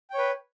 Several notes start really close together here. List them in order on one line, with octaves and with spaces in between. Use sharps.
G5 C#5 B4